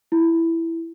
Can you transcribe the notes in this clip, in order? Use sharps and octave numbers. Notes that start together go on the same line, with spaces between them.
E4